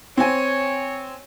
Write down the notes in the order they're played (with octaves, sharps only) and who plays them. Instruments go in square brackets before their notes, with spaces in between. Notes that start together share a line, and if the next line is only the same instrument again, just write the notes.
[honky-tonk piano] C4 G#5 [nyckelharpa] C#5